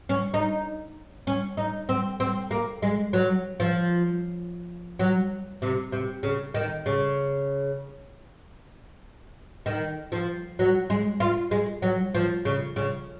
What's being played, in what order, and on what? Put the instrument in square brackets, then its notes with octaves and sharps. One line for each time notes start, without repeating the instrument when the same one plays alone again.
[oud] C#4
D#4
C#4
D#4
C4
C4
A#3
G#3
F#3
F3
F#3
C3
C3
C#3
D#3
C#3
D#3
F3
F#3
G#3
F4
G#3
F#3
F3
C#3
C#3